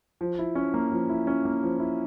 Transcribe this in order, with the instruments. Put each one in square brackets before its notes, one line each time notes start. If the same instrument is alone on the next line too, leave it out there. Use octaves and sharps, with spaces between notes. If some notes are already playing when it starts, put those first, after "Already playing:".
[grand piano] F3
E4
C#4
A#3
F3
E4
C#4
A#3
F3
E4